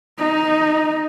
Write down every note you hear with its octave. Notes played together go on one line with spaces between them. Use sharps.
D#4